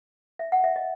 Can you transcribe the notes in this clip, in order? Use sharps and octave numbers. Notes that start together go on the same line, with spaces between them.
E5
F#5
E5
D#5